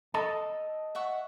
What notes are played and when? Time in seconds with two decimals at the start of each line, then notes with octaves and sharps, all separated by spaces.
0.14 A4 D#5 A5
0.95 E5 F#5 C#6